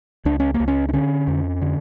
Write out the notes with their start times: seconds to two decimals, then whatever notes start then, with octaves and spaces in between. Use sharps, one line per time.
0.25 C#2 D4
0.40 C#4
0.54 A#3
0.60 C#2
0.68 C#4
0.89 D4
0.93 D3 C#4
1.27 F2
1.62 D3